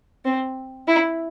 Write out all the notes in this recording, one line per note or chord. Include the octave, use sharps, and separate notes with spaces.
C4
E4